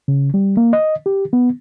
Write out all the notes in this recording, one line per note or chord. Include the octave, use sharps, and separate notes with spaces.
C#3
G3
A#3
D#5
G4
B3